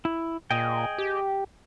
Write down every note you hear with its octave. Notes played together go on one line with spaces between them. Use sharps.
E4
A#2 G#4 D#5 G5
G4